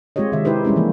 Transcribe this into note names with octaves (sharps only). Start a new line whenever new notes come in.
G#3 C4 F4 G4 C#5 D#5
C3 D#3 E5
D#4 E4 G4 B4 C5
G3 G#3 C#4 E4
E3 F3 A#3